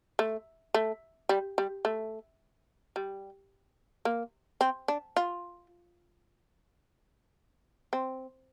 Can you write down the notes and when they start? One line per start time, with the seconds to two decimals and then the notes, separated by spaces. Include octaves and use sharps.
0.19 A3
0.74 A3
1.29 G3
1.58 G3
1.85 A3
2.96 G3
4.05 A#3
4.61 C4
4.88 D4
5.17 F4
7.93 C4